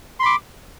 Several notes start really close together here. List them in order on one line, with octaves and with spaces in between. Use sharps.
C6 B5 D6